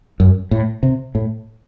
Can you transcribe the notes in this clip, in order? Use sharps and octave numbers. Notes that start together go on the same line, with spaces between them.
F#2
A2
C3
A2